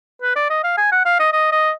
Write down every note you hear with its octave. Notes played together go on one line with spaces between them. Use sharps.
B4
D5
D#5
F5
G#5
F#5
F5
D#5
D#5
D#5